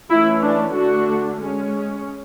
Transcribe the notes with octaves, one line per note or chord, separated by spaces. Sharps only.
E3 A3 C#4 E4
D4
D3 A3 D4 F#4
G#3 C#4